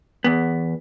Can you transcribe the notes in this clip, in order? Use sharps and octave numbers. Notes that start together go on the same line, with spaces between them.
E2 B3